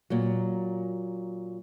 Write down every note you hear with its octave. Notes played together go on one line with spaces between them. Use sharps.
A#2 F#3